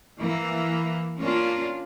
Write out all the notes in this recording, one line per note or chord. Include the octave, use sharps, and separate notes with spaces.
E3 A#3
A#3 C#4 D4 F4